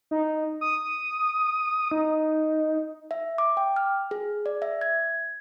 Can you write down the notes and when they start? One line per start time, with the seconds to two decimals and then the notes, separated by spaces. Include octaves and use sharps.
0.11 D#4
0.61 D#6
1.91 D#4
3.11 E5
3.38 D6
3.57 G5
3.76 F6
4.11 G#4
4.46 D5
4.62 E5
4.81 G#6